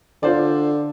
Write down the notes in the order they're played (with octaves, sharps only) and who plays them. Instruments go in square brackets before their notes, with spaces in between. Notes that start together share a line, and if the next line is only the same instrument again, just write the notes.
[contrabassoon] D3 [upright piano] F4 C5 D5